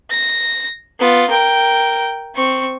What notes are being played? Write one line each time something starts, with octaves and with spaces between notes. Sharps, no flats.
A#6
B3 F4
A#4 G5
C4 C#6